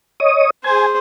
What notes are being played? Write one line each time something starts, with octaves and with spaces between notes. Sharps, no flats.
C#5 D#5 D#6
G#4 C5 G#5